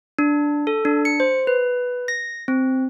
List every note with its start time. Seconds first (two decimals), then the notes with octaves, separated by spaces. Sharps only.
0.19 D4
0.67 A4
0.85 D4
1.05 C#7
1.20 C5
1.47 B4
2.08 A#6
2.48 C4